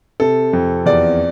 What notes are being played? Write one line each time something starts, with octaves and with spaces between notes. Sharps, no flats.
C3 A4
F2
E2 D5